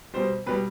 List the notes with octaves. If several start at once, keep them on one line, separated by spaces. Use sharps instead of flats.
B2 G3 C5
B2 G3 B4